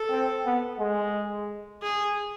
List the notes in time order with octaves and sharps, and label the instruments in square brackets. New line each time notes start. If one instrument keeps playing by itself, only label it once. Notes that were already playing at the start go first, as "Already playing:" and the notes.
Already playing: [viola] A4
[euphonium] C4
B3
G#3
[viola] G#4